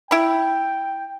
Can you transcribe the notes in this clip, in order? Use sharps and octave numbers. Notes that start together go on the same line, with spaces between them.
E4 G5 B5